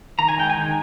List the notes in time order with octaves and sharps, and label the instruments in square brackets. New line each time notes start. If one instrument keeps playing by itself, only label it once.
[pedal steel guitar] D#3 A#5
G#5
G#3 G5
G#5
D#3